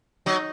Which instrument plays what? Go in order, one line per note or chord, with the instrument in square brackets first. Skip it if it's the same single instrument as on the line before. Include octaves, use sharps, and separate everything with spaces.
[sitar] F#3 [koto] D#4